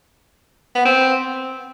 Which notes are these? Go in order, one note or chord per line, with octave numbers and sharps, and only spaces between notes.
B3
C4